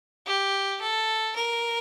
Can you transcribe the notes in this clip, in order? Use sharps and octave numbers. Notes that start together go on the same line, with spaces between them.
G4
A4
A#4